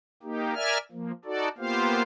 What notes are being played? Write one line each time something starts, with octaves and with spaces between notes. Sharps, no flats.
A#3 D#4 G4
A#4 D5 E5 G#5 F6
F3 A#3
D#4 F#4 A4 D5
A#3 B3 F4 G4 C5 F5